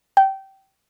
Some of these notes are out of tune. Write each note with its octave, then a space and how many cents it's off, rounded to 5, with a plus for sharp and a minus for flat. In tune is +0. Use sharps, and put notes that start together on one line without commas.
G5 -20